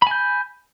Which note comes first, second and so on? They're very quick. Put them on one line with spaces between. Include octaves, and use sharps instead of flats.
B5 G#5 G6